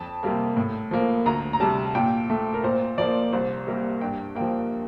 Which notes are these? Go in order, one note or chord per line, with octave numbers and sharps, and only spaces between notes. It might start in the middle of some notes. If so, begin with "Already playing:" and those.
Already playing: F2 A5
C3 G3 A#3
A2
F3 A#3
D2 A#5
A#5
C3 G3 A5
A#2 G5
A3
A#4
A#2 C5
F3 A#3 D5
C2 C5
C3 G3 A#3 A#4
G2 G5
F3 A#3 G5